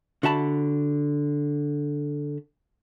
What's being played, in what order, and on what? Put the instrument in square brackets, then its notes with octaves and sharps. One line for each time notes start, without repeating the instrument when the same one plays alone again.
[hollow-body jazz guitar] D3 F#4 E5 A5 B5